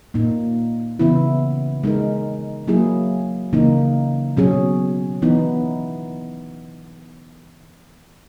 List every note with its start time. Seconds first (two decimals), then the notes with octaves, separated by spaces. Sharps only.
0.14 A#2 A#3 D#4
0.99 C#3 E3 B3 E4
1.83 G#3 D#4 A#4
2.68 F#3 A#3 E4 G#4
3.53 C#3 E3 A#3 D#4
4.37 B2 F#3 C#4 G#4
5.22 E3 B3 D#4